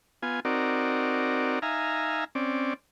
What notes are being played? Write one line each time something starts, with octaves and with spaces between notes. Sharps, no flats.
B3 F4 G#5
C4 D#4 F#4 A#4 D5
D#4 E5 F5 G#5 A#5
C4 C#4 D5